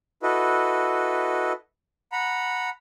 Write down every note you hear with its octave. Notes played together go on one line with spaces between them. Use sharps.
E4 F#4 A4 B4 D#5
F#5 A#5 B5